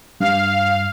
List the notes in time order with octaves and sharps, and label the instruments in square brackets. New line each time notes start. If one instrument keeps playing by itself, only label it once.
[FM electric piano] G2 [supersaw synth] F5